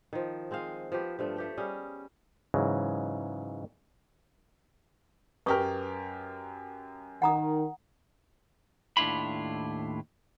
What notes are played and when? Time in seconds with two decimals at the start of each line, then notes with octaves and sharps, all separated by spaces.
0.13 D#3 F3
0.51 G#3 C4 G#4 F5
0.92 F3 B3 G4
1.19 G2 F3 A3
1.36 A3 G4 G5
1.57 G3 C#4 G#4 D#5
2.54 G#2 C#3 E3 F#3
5.46 F#2 G4 A#4 B4 C#6 D#6
7.22 D#3 F#5 A#5 D#6
8.97 D#2 A2 D4 E4 F4 B5